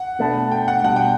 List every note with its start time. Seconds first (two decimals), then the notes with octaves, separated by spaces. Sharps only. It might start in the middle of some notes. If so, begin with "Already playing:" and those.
Already playing: F#5
0.19 B2 A3 D4
0.52 G5
0.68 F#5
0.84 B2 G3 D4 F#5
0.96 G5